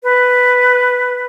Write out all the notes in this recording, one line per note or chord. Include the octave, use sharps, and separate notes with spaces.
B4